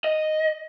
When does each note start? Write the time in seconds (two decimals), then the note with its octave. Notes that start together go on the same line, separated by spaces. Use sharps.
0.04 D#5